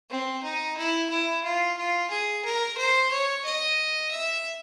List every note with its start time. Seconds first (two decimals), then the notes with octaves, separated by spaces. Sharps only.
0.10 C4
0.43 D#4
0.77 E4
1.10 E4
1.43 F4
1.77 F4
2.10 G#4
2.45 A#4
2.77 C5
3.11 C#5
3.45 D#5
4.11 E5